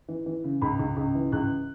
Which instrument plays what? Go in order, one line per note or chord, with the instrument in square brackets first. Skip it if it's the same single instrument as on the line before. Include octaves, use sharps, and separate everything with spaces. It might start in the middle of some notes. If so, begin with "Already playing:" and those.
[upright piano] E3
E3
C#3
C#2 B5
C#2
C#2
E3
C#2 F#6